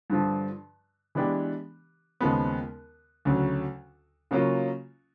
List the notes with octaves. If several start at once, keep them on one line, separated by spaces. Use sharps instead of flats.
G2 D3 F3
E3 G#3 B3 D4 G4
D#2 C#3 F3 G#3 B3
D2 C#3 F#3
C#3 F#3 A#3 C#4 F4